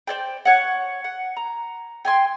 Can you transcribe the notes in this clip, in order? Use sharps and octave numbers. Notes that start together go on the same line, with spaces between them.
C5 D5 G5
C#5 F#5
F#5
A#5
G5 G#5 C6